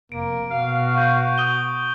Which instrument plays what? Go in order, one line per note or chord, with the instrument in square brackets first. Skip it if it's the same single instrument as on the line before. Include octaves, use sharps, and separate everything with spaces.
[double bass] F1 [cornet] A#3 [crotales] D7
[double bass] B2 [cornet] F#4 [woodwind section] F5
[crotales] C#6 G6
D#6 D#7 G7